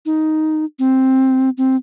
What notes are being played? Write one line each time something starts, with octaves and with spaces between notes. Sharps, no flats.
D#4
C4
C4